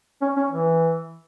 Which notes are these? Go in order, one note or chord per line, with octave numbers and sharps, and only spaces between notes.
C#4
C#4
E3